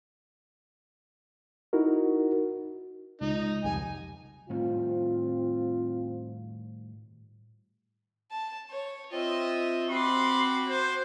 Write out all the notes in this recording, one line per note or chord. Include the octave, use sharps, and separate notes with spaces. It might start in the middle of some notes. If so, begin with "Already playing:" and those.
D#4 E4 F#4 A#4
C#2 D#4
C2 F2 G3 G#5
A2 D#3 G3 C4 F4
A5
C#5
C4 F4 D#5 E5
C4 F#4 B5 C6 D6
C5